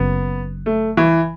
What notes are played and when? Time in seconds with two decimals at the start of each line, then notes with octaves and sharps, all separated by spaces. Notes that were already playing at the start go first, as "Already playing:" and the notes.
Already playing: F#1 F#2 C#3 B3
0.66 A3
0.97 E3